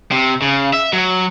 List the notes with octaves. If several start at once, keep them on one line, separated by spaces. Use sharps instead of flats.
C3
C#3
E5
F#3